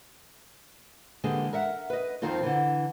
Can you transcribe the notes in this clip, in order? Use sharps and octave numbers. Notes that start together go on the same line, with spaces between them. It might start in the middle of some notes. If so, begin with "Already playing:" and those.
D3 E3 G#3 A#3 G4 G#4
A#4 E5 F#5
B4 D#5
F2 D#3 F3 C4 F4
D3 E3